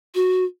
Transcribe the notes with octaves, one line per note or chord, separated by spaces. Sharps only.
F#4